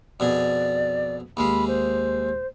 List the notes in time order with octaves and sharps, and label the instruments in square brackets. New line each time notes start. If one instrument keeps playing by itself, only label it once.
[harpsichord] F2 B2 G#4 [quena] D5
[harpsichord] D#2 G#3 F5 [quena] B5
[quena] C5